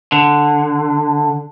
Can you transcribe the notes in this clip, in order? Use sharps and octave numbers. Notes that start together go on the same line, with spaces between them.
D3